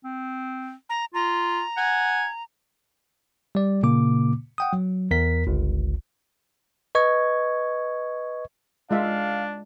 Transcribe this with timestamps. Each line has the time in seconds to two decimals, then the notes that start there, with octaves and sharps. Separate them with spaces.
0.05 C4
0.89 A#5
1.14 F4 A#5
1.77 F#5 G#5
3.55 G3 D5
3.83 A#2 C#3 A#3 D6
4.58 F#5 G5 D#6
4.73 F#3
5.11 E2 A#4 B6
5.47 G1 C#2
6.95 B4 D#5 C#6 G#6
8.91 G#3 D4 F4 E5 F5